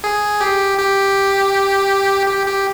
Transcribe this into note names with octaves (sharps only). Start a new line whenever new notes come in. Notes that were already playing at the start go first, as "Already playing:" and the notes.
G#4
G4
G4
G4
G4